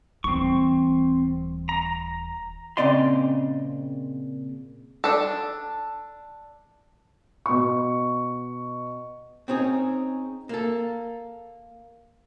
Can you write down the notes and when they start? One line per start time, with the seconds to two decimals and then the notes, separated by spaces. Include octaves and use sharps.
0.24 D#1 E3 C4 C#6
1.69 A#5
2.77 A#2 C#3 C4 D5 D#5 C6
5.04 D4 A4
7.46 B2 C#6
9.48 C4 C#4 D#4 G#4
10.49 A#3 A4